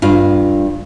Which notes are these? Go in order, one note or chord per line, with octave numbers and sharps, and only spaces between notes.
G2 F4